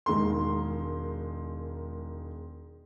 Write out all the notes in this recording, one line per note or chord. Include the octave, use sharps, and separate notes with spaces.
E1 D#3 G#3 A#4 C6